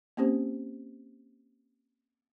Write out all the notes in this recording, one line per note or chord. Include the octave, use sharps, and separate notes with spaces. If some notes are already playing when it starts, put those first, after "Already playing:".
A#3 C4 C#4 G4 C5